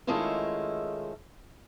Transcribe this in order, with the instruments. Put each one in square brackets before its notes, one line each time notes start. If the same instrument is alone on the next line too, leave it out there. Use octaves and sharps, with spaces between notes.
[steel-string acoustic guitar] D#3 G#3 A3 C#4 E4 F4